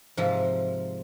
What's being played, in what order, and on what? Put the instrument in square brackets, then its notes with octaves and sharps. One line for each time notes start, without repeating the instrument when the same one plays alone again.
[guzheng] G#2 C3 F3 G#3 A#4 E5